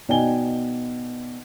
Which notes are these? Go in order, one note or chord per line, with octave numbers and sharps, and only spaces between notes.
B2 D#4 D5 G5 G#5 G7